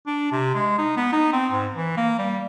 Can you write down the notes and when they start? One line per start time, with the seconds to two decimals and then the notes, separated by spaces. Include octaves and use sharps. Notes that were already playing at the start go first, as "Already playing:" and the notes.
0.07 D4
0.32 C3
0.55 G#3
0.78 D#4
0.97 B3
1.13 D#4
1.33 C4
1.51 G#2
1.73 E3
1.97 A#3
2.19 G3